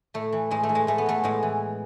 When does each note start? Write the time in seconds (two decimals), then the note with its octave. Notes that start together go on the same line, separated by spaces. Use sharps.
0.14 A2 A3
0.33 E3
0.51 A2 G#3
0.63 A3
0.69 E3
0.75 G#3
0.87 A2 A3
0.98 B3
1.06 E3 A3
1.24 A2 G#3
1.43 E3